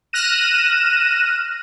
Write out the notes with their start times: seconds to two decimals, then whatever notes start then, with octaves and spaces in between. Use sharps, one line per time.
0.13 F6 F#6 A#6 D#7 E7